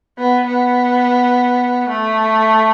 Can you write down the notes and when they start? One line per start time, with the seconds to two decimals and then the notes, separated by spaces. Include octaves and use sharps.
0.19 B3
0.47 B3
1.89 A3